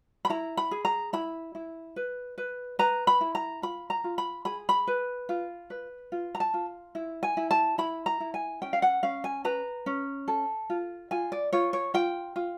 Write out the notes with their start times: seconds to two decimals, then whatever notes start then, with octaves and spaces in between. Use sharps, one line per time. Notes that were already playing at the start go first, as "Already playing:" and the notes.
0.25 B5
0.30 E4 A#5
0.57 B5
0.71 G#4
0.85 A#5
1.13 E4 B5
1.55 E4
1.96 B4
2.38 B4
2.79 B4 A#5
3.07 B5
3.21 E4
3.35 A#5
3.62 F4 B5
3.90 A#5
4.04 F4
4.18 B5
4.45 G#4 B5
4.69 B5
4.87 B4
5.29 F4
5.70 B4
6.12 F4
6.35 A#5
6.40 A5
6.54 F4
6.95 E4
7.23 G#5
7.37 E4
7.51 A5
7.78 E4 B5
8.06 A#5
8.20 E4
8.34 G#5
8.62 C#4 G5
8.73 F5
8.82 F#5
9.03 C#4 F5
9.24 G#5
9.45 B4 A#5
9.86 C#4
10.28 A4
10.70 F4
11.11 F4 G#5
11.32 D5
11.53 F4 C#5
11.73 C#5
11.94 F4 G5
12.36 F4